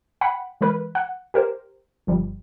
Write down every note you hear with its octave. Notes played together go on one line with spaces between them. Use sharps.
F#5 G5 B5
E3 G#3 A#4 B4
F#5
G4 A#4 C5
G1 F3 G3